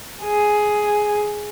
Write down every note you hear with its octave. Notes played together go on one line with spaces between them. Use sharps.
G#4